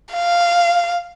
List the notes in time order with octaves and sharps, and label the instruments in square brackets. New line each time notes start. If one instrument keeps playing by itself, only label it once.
[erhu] F5